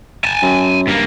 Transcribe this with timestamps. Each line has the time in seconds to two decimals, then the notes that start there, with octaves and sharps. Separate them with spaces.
0.25 G#5 A5
0.42 F#2
0.87 G2 A#3